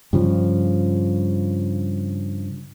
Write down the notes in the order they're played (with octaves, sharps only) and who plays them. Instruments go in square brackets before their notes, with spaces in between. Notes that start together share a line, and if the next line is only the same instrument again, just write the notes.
[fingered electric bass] G2 C#3 F3